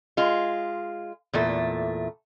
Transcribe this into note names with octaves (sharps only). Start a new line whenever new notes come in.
G#3 F4
E2 A#2 A3